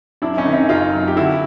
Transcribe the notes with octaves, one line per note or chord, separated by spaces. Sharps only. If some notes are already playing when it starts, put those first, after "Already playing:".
F#2 D4 E4
C#4 D#4
D#3
C#4 D#4
F#1 D#4 F4
F#3
G4
D3 E4 F#4